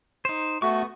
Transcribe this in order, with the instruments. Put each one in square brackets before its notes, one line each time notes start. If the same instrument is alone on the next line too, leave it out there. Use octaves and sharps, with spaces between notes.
[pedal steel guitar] D#4 C5
[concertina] A3 F#4 [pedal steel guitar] B3 C#6